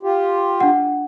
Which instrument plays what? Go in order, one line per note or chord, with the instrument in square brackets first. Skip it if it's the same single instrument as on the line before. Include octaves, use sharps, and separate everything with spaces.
[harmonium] F4 G4
[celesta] D4 F#5